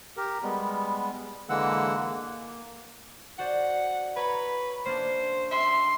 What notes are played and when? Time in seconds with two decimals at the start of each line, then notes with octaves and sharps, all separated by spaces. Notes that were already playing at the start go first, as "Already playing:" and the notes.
0.17 G4 A#4
0.43 G3 G#3 B3
1.49 D3 E3 G#3 A#3 F#5 E6
1.96 A#3
3.39 F#4 C5 D5 F#5
4.17 B4 C#5 A#5 B5
4.86 A#3 C#4 D4 C5
5.51 E5 C6